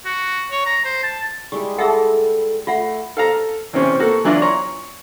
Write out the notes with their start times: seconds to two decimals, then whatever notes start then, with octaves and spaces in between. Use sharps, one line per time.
0.05 F#4
0.51 C#5
0.66 A#5
0.85 C5
1.03 A5
1.52 G3 G#3 E4 G4
1.78 G#4 A4 E5 F#5
2.67 A3 F4 E5 F#5
3.17 A4 F5 A#5
3.73 E2 C3 C4 C#4
3.99 A#3 F#4 A4
4.25 E3 F#3 D4 E4 F4
4.42 C#5 A#5 C6